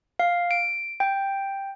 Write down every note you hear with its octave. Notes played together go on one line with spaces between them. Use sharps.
F5
D7
G5